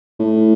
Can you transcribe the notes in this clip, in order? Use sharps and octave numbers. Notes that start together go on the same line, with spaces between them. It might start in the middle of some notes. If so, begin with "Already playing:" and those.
A2